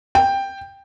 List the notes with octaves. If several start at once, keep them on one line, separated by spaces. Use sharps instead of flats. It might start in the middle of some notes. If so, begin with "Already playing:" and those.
G5